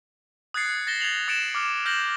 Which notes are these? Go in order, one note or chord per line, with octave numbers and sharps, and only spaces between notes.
D#6 F#6 G#6 A6 C7 C#7
A6 A#6 E7 G7
G#6 A6 F7 F#7
D#6 A6 C#7 D7 E7
D6 F6
F6 G6 A#6 E7 F#7